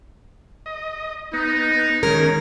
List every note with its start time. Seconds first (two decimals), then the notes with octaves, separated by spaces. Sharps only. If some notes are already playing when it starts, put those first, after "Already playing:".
0.66 D#5
1.33 B3 D#4
2.03 D#3 G#3 C#4 A#4